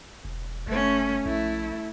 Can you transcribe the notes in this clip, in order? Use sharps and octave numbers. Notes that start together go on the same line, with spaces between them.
E1
F#1 A3 C#4
A#1 A3 E4